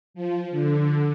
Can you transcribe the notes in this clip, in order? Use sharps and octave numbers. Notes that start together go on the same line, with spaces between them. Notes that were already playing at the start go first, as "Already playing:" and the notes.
F3
D3